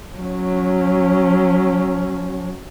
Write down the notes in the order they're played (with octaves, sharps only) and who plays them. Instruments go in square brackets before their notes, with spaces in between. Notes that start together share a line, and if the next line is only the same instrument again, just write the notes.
[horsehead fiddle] F#3 C#4